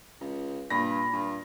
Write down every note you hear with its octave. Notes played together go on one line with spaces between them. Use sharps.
C#2
G2 A#2 B5 A#6
G2